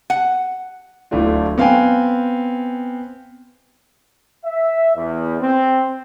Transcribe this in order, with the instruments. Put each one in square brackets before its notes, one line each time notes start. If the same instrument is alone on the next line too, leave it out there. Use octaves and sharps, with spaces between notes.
[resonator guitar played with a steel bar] F#5
[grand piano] D1 A2 A3 D4 F4
B3 C4 F5 G5 G#5
[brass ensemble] E5
E2
C4